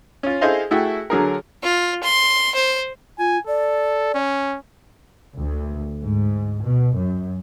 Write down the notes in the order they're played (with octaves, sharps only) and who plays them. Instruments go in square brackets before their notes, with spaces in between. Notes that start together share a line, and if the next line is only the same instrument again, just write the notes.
[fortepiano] C#4 F4
E4 G#4 A4 C5 D#5 F5
A3 E4 F#4 G#4 G5
D3 F#3 G#4 A#4
[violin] F4
C6
C5
[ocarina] F4 [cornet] G#5
[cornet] A4 [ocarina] D5
[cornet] C#4
[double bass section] D2
G#2
B2
F#2